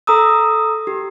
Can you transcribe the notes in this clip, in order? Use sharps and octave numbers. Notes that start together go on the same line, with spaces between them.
A4 A#5 D#6 E6
G4